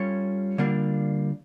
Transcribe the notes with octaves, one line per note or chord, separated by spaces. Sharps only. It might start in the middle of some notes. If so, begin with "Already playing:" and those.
Already playing: G3 C#4 F4 A4 C#5
D3 G3 A#3 D4 F4